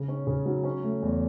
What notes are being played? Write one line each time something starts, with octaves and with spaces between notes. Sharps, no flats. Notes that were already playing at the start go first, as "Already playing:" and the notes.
Already playing: C#3
C#4
C#3
F#3
C#4
A3
E2